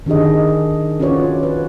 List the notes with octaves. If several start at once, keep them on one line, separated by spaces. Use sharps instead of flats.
D#3 D4 G4 G#4 D#5
C#4 F4 F#4 B4 C#5 D5
B4